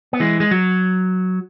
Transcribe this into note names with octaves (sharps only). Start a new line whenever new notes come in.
B3
E3 G#3
G#3
F#3